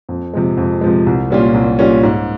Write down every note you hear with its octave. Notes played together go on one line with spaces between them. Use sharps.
F2
C3 F3 G#3
F2
C3 F3 G#3
C2
A#2 G3 C#4 F4
C2
A#2 G3 C#4 F4
G#2